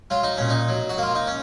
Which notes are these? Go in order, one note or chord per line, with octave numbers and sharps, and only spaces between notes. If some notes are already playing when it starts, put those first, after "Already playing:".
F#3 F4
D#4
A#2 C#4
D#4
F#3
F#4
A#3 F4
D#4
C#4